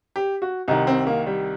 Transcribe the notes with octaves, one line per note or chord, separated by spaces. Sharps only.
G4
F#4
C2 C3 D#3 D#4
C4
A#3
G3